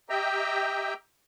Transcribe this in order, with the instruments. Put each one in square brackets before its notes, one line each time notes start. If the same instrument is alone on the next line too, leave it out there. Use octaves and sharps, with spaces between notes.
[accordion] G4 D#5 E5 G5 A#5